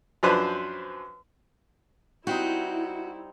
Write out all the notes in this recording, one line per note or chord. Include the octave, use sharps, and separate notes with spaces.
F#2 F3 D4 B4 C5 F#6
G3 C4 D#4 E4 F#4